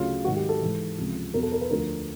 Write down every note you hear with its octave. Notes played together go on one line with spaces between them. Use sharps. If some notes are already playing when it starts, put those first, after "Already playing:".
Already playing: D2 C#3 F#3 F4
G#2 D#3 F#3 F#4
G4
A4
G#2 E3
C#2 C3 F3
E2 B2 F#3 A#4
A4
A#4
B4
D2 D3 F3 A#4